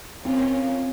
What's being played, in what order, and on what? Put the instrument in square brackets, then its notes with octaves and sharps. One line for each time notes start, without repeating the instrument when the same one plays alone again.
[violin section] A#3 C#4 F4 [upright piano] C4